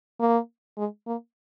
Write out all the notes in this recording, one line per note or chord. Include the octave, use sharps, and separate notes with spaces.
A#3
G#3
A#3